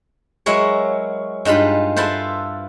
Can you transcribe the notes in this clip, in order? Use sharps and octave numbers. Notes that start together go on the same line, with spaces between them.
F#3 G#3 E4 A#4 C#5
G2 G#3 D#4 F4 B5
E4 F4 A4 B4 C5